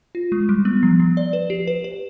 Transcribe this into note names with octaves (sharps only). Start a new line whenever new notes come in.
F4
G#3
G3
B3
F3
F3
D5
B4
G4
B4
B4